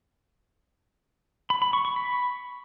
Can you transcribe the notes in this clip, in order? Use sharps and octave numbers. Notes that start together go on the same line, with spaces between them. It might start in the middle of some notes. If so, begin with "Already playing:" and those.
B5
B5
C#6
C#6
B5